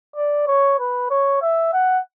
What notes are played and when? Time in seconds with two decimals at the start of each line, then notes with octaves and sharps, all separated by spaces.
0.16 D5
0.47 C#5
0.79 B4
1.10 C#5
1.42 E5
1.73 F#5